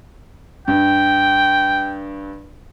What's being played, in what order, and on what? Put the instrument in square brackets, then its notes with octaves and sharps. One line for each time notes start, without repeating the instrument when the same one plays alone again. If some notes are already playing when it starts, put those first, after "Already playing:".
[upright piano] G2 [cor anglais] G5